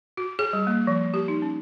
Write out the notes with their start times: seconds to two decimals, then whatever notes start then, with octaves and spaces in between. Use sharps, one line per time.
0.17 F#4
0.39 G#4
0.53 G3
0.67 A#3
0.87 F3
1.14 G4
1.28 D#4
1.42 C#4